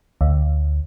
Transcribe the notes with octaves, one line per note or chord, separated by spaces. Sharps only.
D2